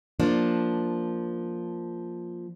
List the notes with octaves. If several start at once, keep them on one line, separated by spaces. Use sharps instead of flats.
F3 A#3 D4